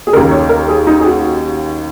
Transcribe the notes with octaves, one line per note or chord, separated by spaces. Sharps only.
G#4
D#2 C#3 A#4
C#5
A#4
G#4
D#4
G#4
F#4